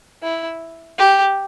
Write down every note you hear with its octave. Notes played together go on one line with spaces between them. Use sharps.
E4
G4